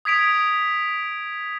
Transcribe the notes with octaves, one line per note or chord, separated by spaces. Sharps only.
D#6 G#6 B6 D7 F7